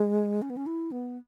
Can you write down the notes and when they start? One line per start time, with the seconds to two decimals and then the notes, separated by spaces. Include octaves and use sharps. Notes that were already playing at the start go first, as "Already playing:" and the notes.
Already playing: G#3
0.42 C#4
0.50 B3
0.57 C#4
0.66 E4
0.92 B3